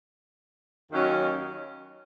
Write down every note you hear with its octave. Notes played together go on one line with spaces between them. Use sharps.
D#2 D#3 F#3 C#4